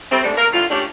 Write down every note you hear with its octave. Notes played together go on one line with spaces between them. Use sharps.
G3 A3 C4
G#2 D3 G3 A3 D4
A#4
A2 D3 F4
A3 C#4 D4 G4